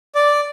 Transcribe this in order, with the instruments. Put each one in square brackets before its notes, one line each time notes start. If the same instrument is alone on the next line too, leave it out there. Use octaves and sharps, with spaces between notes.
[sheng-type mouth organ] D5